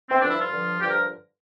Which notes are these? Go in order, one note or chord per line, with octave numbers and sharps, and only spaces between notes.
C4
G2 D3 F3 D4
E4
F4
G2 D3 F3
G2 D3 F3 G4
A#4